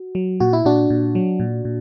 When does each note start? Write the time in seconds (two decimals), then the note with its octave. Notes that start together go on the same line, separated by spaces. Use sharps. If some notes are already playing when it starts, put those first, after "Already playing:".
Already playing: F#4
0.15 F#3
0.40 A#2 F#4
0.53 E4
0.65 A#2 D4 F#4
0.90 A#2
1.15 F#3
1.40 A#2
1.65 A#2